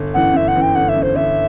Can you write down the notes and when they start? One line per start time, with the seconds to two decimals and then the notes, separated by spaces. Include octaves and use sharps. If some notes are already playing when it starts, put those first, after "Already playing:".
Already playing: G1
0.14 F#2 E3 F#5
0.34 G1 E5
0.48 F#5
0.55 F#2 E3
0.62 G5
0.75 G1 F#5
0.89 E5
0.95 F#2 E3
1.03 C5
1.15 G1 E5